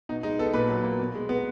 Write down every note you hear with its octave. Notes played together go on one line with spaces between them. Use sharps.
B2 D#4
G#3 D#4
B3 A4
A#2 B4
F#3
A#3
B2
G#3
B3